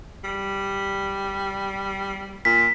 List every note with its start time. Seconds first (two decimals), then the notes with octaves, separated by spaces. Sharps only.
0.24 G3
2.45 A#2 B6